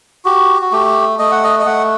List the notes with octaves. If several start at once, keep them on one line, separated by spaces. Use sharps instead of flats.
F#4 G4
F#4
A3 G4
A3 D#5
F#5
D#5
D#5
A3 F#5